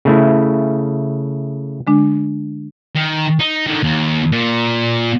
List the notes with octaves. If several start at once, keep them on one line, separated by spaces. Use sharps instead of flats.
C#3 A3 E4
D3 G#3 D4
D#3
D#4
D3 D#3
D#2
A#2